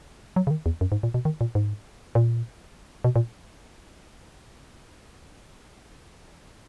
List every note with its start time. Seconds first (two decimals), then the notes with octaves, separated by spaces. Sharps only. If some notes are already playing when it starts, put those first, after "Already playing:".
0.36 F#3
0.47 C#3
0.51 D#3
0.66 E2
0.81 F#2
0.92 G#2
1.03 A#2
1.14 B2
1.25 D#3
1.41 A#2
1.55 G#2
2.15 A#2
3.04 B2
3.16 A#2